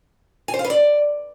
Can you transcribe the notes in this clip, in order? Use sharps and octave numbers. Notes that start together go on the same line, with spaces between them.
G#5
C5
F5
B4
D5